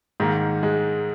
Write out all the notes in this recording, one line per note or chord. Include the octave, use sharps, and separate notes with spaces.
G#2 D#3 A#3
G#3